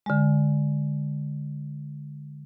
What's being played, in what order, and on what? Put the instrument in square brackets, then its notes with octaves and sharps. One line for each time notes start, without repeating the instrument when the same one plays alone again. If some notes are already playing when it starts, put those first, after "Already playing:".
[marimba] D3 G#3